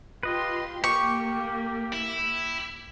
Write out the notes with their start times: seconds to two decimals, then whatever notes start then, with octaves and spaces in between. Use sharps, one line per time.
0.23 F4 G4 B4 D#5 C6
0.84 A#3 G4 C#6
1.93 E4